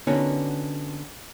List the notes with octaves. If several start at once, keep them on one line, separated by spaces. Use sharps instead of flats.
D3 B3 C#4 D#4 F#4 A#4